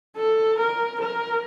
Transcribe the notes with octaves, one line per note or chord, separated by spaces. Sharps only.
A4
A#4
A#4